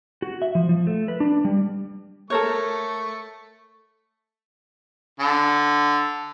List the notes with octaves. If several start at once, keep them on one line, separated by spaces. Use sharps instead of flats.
F#4
E5
F3
F3
A3
B4
D4
G3
A3 A4 A#4 C#5 C#6
D3